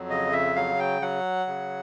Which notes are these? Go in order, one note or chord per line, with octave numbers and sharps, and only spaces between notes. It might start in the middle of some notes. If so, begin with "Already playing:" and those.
Already playing: F2 F#3
C#3 D#5
E5
F#3 F5
G5
F#3 F#5
C#3